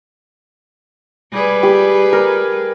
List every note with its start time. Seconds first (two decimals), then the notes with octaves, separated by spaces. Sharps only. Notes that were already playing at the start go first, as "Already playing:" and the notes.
1.33 G3 G#4 B4
1.63 G4
2.13 A#4